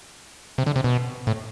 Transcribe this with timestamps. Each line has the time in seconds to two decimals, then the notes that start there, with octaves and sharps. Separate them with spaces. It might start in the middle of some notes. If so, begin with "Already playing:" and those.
0.58 C3
0.67 D3
0.76 C3
0.84 B2
1.27 A2